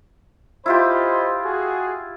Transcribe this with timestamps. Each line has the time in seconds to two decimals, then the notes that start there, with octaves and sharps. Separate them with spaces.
0.66 E4 F4 G4 C5 D#5 B5
1.45 F#4 G#4